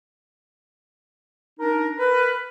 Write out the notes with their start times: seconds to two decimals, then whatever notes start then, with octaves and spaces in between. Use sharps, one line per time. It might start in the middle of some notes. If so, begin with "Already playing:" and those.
1.59 D4 D#4 A#4
1.99 A#4 B4